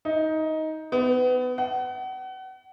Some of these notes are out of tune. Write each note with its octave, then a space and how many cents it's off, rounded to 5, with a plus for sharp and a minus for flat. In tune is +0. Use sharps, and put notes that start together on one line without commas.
D#4 +15
B3 +30
F#5 +35